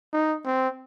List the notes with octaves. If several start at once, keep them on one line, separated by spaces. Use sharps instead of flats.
D#4
C4